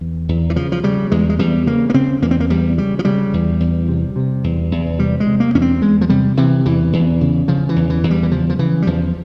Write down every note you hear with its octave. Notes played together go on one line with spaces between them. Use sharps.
E2
E2
E3
C#3 F3
F3
C#3 G3
E2 G#3
G#3
E2 G3
C#3 A#3
A#3
C#3 C4
E2 A#3
C4
A#3
E2 G3
C#3 G3
F3
C#3 G3
E2
E2
C3
C3
E2
E2
C3 G3
G#3
C3
A#3
E2 C#4
C4
E2 G#3
F3
C3 G3
C3 E3
E2 E3
E2
C#3
C#3 F3
E3
E2
E3
E2
G3
E3
C#3 F3
F3
C#3 E3
G3
E2 F3